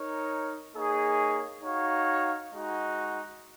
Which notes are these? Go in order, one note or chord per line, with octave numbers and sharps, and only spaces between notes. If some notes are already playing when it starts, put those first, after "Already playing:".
Already playing: D#4 A#4 C#5
A#3 D#4 G#4 C#5
D#4 F#4 C#5 F5
G#3 D#4 F#4